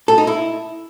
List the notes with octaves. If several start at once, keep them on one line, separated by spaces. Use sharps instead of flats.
A4
D#4
E4